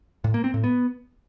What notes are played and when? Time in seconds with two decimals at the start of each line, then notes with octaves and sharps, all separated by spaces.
0.24 A2
0.34 A#3
0.44 C4
0.54 A2
0.64 B3